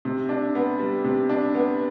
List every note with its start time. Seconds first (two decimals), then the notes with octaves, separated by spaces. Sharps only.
0.05 C3
0.29 D4
0.55 B3
0.79 G3
1.04 C3
1.29 D4
1.55 B3